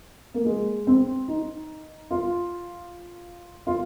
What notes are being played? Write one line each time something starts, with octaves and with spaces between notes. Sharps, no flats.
A#3
G#3
C4
D#4
F4
F4